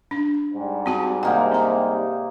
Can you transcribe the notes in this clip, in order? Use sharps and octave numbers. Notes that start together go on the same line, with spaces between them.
D4
G#2 G3
C4 F#4 A5
C3 A#3 D#4 F#5
C4 A#5